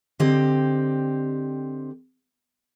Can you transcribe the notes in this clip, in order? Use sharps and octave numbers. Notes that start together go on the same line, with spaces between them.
D3 C4 G4 D#5